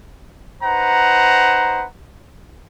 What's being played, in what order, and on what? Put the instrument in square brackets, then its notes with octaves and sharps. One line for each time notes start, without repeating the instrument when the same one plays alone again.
[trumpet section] D#4 B4 C5 F#5 A#5